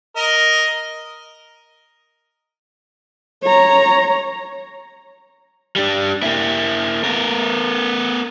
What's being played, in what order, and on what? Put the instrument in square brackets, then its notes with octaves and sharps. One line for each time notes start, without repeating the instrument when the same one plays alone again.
[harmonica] A#4 D#5
[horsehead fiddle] C#5 A#5
[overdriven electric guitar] G3 D4
A#3 E4
B3 A#4